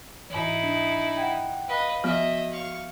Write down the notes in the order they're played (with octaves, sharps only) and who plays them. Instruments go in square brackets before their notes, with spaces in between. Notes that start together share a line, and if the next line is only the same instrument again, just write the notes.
[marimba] G#2 E3 [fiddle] D#4 E4
[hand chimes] D4
[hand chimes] F#5 G5 [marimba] G#6
[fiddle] B4 D#5 [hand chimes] F5
[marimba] F3 B3 [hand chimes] F#4 [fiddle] D#5 E5
[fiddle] F5 C#6